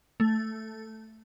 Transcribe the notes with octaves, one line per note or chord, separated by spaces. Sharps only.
A3